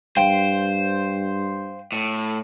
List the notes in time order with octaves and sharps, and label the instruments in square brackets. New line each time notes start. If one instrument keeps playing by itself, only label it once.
[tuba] G2 [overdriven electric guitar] C5 [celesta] F5 [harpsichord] G5
[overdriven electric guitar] A2